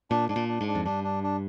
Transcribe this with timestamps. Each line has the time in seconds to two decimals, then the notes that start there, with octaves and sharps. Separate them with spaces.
0.11 A#2 D4
0.29 G#2 D4
0.36 A#2
0.48 D4
0.61 G#2
0.68 D4
0.75 F2
0.85 G2 D4
1.04 D4
1.23 D4